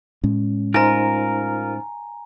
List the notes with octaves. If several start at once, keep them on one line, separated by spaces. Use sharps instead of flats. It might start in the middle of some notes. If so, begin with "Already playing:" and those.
A2 G#3 C#4
D#4 F4 A#4 C5 G#5 A#5